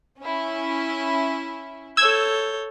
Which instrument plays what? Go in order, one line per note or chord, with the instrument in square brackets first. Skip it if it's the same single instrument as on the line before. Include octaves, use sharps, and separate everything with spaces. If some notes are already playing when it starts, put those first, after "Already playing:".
[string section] C#4 E4
[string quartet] A4 C#5 G6 [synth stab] E6 G#6